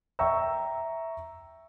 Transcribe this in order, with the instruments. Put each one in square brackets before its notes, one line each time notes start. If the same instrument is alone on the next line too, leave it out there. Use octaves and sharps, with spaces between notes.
[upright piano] E5 G5 A#5 C#6 E6